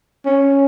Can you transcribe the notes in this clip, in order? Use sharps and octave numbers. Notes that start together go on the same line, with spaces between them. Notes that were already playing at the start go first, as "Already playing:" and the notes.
C#4